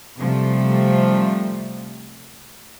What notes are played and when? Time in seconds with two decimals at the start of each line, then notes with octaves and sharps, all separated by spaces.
0.18 C3 F3 G3 A3